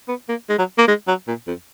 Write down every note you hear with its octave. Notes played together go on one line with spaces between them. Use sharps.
B3
A#3
G#3
F#3
A#3
G#3
F#3
A#2
F2